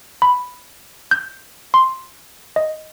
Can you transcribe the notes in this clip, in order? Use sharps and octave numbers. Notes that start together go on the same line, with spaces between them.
B5
G6
C6
D#5